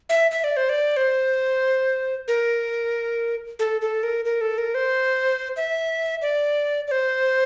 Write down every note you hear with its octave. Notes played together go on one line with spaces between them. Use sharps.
E5
E5
D5
C5
D5
C5
A#4
A4
A4
A#4
A#4
A4
A#4
C5
E5
D5
D5
C5